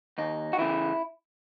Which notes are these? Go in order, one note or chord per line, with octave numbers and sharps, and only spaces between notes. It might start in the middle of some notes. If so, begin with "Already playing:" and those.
D#2 D#4
F#4
C#3 E3 E4